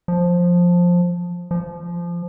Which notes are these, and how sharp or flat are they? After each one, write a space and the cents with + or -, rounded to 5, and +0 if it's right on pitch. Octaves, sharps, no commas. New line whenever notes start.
F3 +10
F3 -15